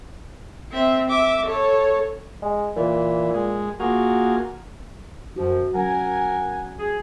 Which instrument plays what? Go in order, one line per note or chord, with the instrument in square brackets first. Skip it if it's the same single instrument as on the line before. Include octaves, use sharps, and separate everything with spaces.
[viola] C4 E5
E5 D6
A4 C#5
[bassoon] G#3
[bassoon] A#2 [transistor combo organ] E3
[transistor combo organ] G#3
[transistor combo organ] A#3 F4 G#4 [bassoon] F#4
[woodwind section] F#2 F3 [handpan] F#3 F#4
[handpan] F#3 C#4 [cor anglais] A#4 [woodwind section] F#5 G#5
[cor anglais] G#4